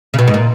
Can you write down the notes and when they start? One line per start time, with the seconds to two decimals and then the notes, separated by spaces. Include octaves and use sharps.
0.14 C#3
0.19 B2
0.28 G#2
0.34 A#2